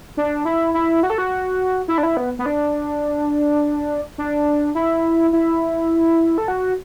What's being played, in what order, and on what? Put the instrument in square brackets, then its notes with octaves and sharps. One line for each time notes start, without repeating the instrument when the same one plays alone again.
[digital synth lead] D4
E4
E4
F#4
A4
F#4
E4
D4
E4
B3
B3
D4
D4
E4
E4
A4
F#4